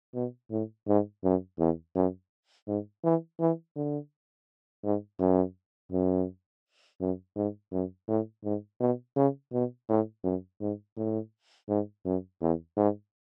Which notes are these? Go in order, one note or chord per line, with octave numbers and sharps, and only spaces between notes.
B2
A2
G#2
F#2
E2
F#2
G#2
E3
E3
D3
G#2
F#2
F#2
F#2
G#2
F#2
A2
G#2
B2
C#3
B2
A2
F#2
G#2
A2
G#2
F#2
E2
G#2